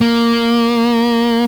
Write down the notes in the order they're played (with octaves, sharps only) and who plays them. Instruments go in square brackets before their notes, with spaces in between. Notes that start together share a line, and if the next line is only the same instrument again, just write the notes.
[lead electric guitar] A#3